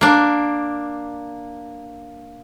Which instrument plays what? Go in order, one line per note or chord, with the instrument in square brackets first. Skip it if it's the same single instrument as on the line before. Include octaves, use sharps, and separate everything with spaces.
[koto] A#3 D4